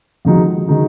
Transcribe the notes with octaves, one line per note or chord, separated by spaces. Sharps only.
F2 D#3 G#3 D#4 F#4
D#3 G#3 D#4 F#4